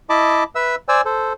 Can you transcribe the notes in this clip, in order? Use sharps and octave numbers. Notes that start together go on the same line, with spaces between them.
E4 D#5 A5 B5 D6
B4 E5 E6
C5 D5 G#5 E6
A4 C5